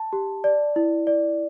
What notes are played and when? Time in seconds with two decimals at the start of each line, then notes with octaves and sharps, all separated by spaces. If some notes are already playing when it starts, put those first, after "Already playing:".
Already playing: A5
0.13 G4
0.44 D5
0.76 E4
1.07 D5